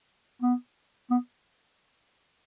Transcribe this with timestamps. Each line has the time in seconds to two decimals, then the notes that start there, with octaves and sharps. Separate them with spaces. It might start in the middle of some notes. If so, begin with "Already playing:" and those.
0.42 B3
1.10 B3